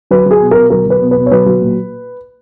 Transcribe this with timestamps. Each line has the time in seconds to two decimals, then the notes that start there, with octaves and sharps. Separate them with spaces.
0.11 F#3 B4
0.26 F#3 G#4
0.40 B2
0.51 B2 A#4
0.70 F#3 A#4
0.86 F#3 B4
1.02 B2
1.11 B4
1.17 B2
1.26 C#5
1.31 F#3 B4
1.46 F#3
1.61 A#2